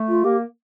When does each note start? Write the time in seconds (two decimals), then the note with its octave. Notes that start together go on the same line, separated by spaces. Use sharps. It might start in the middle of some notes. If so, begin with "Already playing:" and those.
Already playing: A3
0.09 F4
0.24 A#3 G4